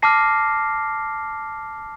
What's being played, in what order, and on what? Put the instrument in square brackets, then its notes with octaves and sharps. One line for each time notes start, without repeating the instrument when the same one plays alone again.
[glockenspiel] A5 D6 F6 A#6 C7